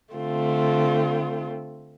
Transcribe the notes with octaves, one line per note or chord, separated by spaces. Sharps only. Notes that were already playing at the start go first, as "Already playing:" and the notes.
D3 A3 C4 F4